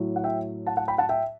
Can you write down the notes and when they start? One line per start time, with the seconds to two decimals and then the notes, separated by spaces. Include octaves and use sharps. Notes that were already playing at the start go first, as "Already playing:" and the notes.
Already playing: A2 F#3
0.16 F#5
0.24 E5 G5
0.67 F#5 A5
0.77 F#5 A5
0.88 G5 B5
0.98 F#5 A5
1.09 E5 G5